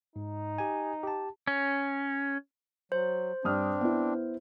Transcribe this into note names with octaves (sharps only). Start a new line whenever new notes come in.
G#2 D#4
G4 G#5
G4 A5
C#4
F#3 C5
G2 C4 D4 D#6 F6
B3 E4